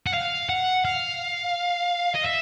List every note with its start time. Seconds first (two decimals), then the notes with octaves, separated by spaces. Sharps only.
0.07 F#5
0.14 F5
0.49 F#5
0.85 F5
2.15 D#5
2.26 E5